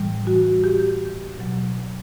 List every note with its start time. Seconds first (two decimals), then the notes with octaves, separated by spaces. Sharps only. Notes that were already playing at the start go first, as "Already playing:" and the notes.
Already playing: A2 E3 G3
0.27 F#4
0.64 G4
1.38 B2 F#3